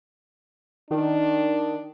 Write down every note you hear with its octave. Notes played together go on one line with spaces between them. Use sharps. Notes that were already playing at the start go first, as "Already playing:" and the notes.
D#3 D4